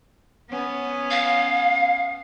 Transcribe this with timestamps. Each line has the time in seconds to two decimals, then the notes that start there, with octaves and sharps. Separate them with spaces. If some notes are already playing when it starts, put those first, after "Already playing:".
0.48 B3 C#4
1.11 F5